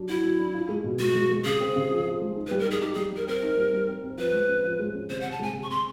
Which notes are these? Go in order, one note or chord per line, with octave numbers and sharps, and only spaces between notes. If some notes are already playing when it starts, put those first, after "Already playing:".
Already playing: F#3 D4
E4 F#4
F#3
D4
F4
G#3
B2
G#3 F#4
G#3
G#3
C#3 G#4
C4
C#3
F3
F3
G#3
D#4
B4
G3
A#4
D#4 G#4
D#4 G4
G3 G#4
G3 A#4
C4 A#4
D#4
G3
G3
C4
C4
F3 B4
G#3
C#4
F3
G#3
C#4
C3 C5
F#5
C3
A5
G#3 G#5
C3
C#6
C3 C6